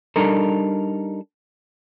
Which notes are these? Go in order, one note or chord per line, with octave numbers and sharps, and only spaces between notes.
G3 D4 D#4 A4 A#4